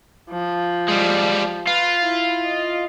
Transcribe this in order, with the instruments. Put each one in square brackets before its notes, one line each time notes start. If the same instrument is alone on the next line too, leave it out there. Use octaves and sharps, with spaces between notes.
[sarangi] F3
[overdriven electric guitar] G3 G#3
[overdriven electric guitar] F4 [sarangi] B4
[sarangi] E4
D#5